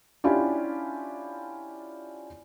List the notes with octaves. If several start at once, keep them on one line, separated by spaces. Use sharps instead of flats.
C#4 D4 E4 F4 G4